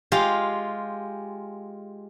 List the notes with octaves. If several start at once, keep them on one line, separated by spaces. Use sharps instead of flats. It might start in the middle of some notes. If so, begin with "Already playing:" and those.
G#3 F4 G4 F5